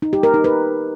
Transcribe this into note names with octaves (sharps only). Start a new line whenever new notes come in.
D#4
G4
A#4
D#4
B4